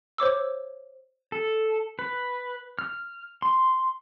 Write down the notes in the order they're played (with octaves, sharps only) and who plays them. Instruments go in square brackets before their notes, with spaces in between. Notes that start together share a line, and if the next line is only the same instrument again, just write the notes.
[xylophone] C5 C#5 D6 E6
[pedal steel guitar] A4
B4
F6
C6